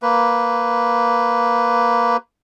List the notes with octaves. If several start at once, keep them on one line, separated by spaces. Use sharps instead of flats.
A#3 B4